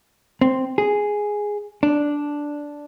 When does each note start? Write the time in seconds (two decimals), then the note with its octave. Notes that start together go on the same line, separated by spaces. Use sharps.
0.41 C4
0.78 G#4
1.83 D4